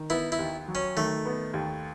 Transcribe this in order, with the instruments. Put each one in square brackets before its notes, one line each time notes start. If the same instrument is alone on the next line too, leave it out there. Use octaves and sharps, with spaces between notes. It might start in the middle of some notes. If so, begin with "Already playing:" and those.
Already playing: [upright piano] D#3
[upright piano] B3 [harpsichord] E4
[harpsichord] E4
[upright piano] D#2
F#3
[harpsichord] C#4
[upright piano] D#3 [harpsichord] A3
[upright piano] B3
D#2